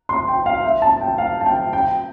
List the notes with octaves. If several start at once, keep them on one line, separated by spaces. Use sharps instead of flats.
C6
G5
F5
E5
A5
G5
F5
A5
G5
G5